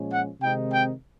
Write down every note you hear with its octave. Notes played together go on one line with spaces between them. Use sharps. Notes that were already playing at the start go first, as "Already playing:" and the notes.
Already playing: A#2 F3 G#3 C#4
F#5
C3 D#3 G#3 C4 D#4 G5
G5